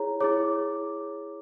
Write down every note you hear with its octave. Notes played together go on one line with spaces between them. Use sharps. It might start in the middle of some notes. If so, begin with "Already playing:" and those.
Already playing: E4 G#4 C#5 A#5
E4 G#4 C#5 D6